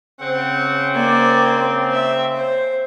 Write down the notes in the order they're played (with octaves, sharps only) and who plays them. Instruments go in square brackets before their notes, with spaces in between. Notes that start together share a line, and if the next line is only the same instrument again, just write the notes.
[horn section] C#3 C4 [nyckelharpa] F#5
[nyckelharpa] A#3 D5
E5
C5